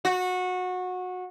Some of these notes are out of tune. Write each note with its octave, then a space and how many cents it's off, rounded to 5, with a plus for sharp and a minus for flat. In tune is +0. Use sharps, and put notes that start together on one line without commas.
F#4 -20